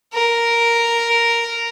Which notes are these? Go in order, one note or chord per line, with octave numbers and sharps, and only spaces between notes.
A#4